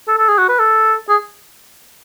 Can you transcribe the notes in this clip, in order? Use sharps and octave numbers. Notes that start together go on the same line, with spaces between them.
A4
A4
G#4
F#4
B4
A4
G#4